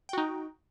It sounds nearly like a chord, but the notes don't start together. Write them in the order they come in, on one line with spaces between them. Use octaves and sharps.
G5 F#4 D#4